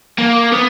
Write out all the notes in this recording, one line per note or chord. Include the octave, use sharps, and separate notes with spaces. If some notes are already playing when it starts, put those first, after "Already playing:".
A#3
B3